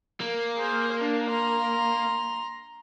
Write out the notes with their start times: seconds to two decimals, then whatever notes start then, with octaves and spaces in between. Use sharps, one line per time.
0.20 A#3
0.56 G#4 C5
1.00 D4
1.30 A#5 C6